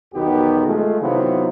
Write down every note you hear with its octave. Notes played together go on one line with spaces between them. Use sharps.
B1 E2 D#3 B3 F#4 G4
G#3 A3 F4
C3 D#3 F#3 B3 E4 F4